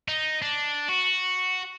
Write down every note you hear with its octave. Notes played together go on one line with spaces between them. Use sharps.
D#4
D4
F#4